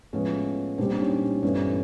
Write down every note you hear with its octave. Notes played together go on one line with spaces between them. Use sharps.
A2 F3 G#3 B3 C#4
A#2 G3 C4 D4
C#4 D#4
G2 E3 A3 B3 C#4